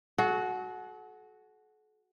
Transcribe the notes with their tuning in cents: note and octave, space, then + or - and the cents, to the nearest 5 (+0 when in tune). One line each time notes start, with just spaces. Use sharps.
F#4 +0 A4 -45